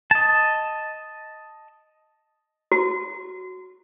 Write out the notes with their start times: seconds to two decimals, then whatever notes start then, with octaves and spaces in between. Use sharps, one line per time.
0.11 D#5 A5
2.72 F#4